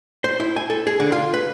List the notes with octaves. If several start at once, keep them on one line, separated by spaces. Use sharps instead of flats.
C5
E4
G#5
A4
G#4
D3
F4
B4